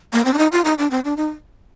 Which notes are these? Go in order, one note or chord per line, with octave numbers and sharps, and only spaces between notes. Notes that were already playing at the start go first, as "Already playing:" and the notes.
A#3
C4
D4
D#4
F4
D#4
D4
C4
D4
D#4